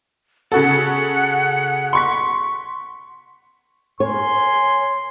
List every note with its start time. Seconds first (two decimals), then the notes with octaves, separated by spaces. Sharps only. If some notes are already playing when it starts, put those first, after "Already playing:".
0.52 C#3 F#4 A4 F#5
1.93 C6 C#6 B6
4.00 A#4 C#5 G#5 C6